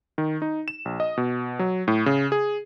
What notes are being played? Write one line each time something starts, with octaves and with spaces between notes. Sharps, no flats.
D#3
D#4
E7
A#1
D#5
B2
F#3
A2
C#3
G#4